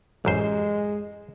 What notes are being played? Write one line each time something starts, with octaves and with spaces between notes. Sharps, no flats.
A1 F#2 G#3 C5